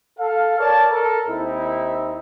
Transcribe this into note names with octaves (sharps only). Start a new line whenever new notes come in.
A4 F5
A#4 C#5 D5 A5
A4 A#4
D#2 C4 D#4 E4